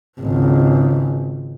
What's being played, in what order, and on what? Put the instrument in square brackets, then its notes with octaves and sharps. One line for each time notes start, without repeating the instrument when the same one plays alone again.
[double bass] G#1 C#2